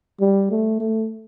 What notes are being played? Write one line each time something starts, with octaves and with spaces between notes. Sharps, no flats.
G3
A3
A3